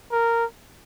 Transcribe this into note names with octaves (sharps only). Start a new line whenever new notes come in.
A#4